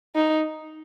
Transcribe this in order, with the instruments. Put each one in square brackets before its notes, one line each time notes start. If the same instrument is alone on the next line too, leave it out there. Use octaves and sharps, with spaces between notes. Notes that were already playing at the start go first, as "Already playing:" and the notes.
[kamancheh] D#4